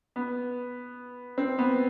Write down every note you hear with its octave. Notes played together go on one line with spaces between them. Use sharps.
B3
C4
B3